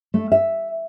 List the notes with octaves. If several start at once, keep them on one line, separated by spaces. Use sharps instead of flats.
A3
E5